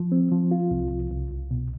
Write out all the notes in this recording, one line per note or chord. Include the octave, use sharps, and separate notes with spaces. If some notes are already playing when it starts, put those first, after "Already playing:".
Already playing: F3
C4
F3
F4
C2
C2
C2
C2
B2